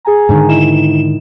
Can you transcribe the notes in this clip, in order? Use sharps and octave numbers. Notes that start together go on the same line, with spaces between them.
G#4 G#5 A#5
G#2 D3 D#3
D#4 E4 E7